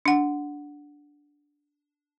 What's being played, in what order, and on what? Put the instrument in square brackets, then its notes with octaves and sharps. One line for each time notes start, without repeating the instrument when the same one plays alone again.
[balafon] D4 F#5